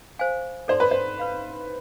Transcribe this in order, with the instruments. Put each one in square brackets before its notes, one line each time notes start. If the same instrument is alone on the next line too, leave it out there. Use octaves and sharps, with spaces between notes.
[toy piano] C5 F5 G#5
[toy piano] A4 D5 A5 C6 [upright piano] C5
[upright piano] B4
C5
[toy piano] B4 F5 B5